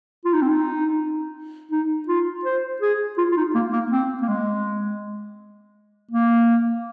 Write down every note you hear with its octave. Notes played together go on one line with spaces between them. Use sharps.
F4
D#4
C4
D#4
D#4
F4
C5
G#4
F4
F4
D#4
A#3
A#3
C4
A#3
G#3
A#3